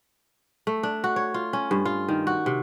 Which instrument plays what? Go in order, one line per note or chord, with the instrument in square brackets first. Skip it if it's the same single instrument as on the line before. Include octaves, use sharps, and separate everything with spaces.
[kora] A3
D4
F#4
C#5
F4
C#4
G2
F4
D#3
F#4
C3